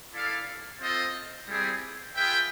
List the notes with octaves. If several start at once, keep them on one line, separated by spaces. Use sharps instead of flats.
E4 A4 D5 F5
C4 F4 A4 C5 D#5
G3 C4 E4 G#4
F4 G#4 B4 E5 G5